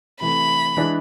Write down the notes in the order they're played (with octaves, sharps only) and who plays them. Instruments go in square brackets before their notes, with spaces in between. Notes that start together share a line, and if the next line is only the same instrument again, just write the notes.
[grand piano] C3 E3 A3 [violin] B5
[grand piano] E3 G#3 D4 G#4